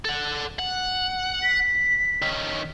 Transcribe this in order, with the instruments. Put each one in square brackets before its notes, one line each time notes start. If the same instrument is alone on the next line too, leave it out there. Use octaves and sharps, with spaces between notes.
[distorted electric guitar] A4 F#5
F#5
[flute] B6
[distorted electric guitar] D#3 C#4